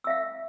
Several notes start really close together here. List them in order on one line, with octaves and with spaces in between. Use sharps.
E6 E5 F5